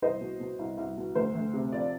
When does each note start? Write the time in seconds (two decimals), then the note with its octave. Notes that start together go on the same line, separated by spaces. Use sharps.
0.02 C2 C5 D#5
0.21 B2
0.40 B2
0.59 C2
0.78 C2
0.97 B2
1.15 D2 C5
1.35 D2
1.54 C3
1.72 F3 D5